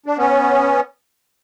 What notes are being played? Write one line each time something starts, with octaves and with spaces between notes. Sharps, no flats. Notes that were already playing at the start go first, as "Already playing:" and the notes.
D4
B3 C#4